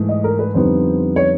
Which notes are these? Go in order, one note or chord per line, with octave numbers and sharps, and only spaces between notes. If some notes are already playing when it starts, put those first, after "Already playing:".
Already playing: G#2 E3 A3
D#5
A#4
B4
F2 D3 G3 B3 D#4 C5
C#5